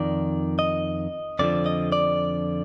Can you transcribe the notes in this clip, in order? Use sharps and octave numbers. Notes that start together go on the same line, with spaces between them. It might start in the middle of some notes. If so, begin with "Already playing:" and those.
Already playing: F2 D#3 D5
D#5
F2 D3 F3 D5
D#5
D5